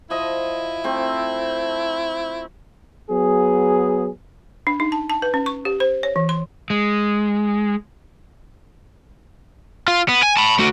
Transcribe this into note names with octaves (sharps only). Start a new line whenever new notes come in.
F3 E4 D#5
A3 C4 A4
F#3 B3 G#4
D4
D#4
A5
A5
B4
C#4
C#6
G4
C5
C#5
E3
C6
G#3
F4
B3
G#5
A5 B5
A3 F#4